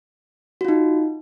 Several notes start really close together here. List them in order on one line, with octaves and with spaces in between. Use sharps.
F#4 F4 D#4